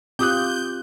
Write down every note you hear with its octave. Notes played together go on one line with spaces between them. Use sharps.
C4 F4 G4 D6 D#6 F#6 G6